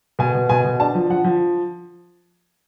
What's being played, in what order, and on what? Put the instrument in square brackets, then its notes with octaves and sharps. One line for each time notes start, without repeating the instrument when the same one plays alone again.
[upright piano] B2 G#5
B2
B2 G#5
B2
D4 A5
F3
F3 F#5
F3